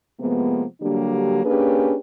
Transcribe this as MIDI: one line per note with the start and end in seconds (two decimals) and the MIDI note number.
0.20 0.64 48
0.20 0.64 53
0.20 0.64 56
0.20 0.64 58
0.20 0.64 59
0.82 1.45 50
0.82 1.45 54
0.82 1.45 55
0.82 1.45 58
0.82 1.45 62
0.82 1.45 67
1.45 1.96 58
1.45 1.96 61
1.45 1.96 62
1.45 1.96 67
1.45 1.96 68
1.45 1.96 71